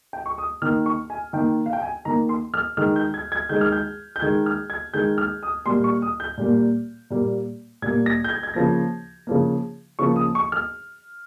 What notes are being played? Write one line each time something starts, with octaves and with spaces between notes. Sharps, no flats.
G5
C#6
D#6
D#3 A#3 F6
C#6
G#5
D#3 A#3 G5
F5
G5
G#5
D#3 A#3 A#5
C6
F6
D#3 G#3 F6
G6
G#6
G#6
D#3 G#3 G6
F6
G6
G6
D#3 G#3 G#6
F6
G#6
D#3 G#3 G6
F6
D#6
A#2 G3 A#3 C6
C#6
D#6
G6
A#2 G3 A#3
A#2 G3 A#3
A#2 G3 A#3 G#6
A#6
G6
G#6
G#6
C#3 F3 A#3 A#6
C#3 F3 A#3
C#3 F3 A#3 C#6
D#6
C#6
F6